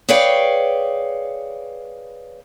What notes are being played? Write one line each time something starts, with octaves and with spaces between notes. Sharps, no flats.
G#4 B4 C#5 D5 F5 G5